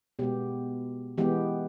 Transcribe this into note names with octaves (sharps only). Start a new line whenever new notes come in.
B2 G#3 B3 G4
E3 G#3 B3 G4